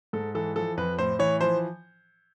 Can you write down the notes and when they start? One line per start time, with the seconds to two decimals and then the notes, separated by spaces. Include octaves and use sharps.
0.13 G#2 A4
0.35 E3 A4
0.56 F3 A4
0.77 F2 B4
0.98 A2 C5
1.19 E3 C#5
1.41 F3 C5